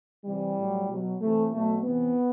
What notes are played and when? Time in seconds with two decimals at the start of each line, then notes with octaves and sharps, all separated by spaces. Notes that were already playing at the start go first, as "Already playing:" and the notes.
0.25 C3 E3 G3
0.56 A2 F#3
0.88 B2 F#3
1.21 C3 E3 A3
1.52 B2 F#3 A3
1.83 C3 E3 B3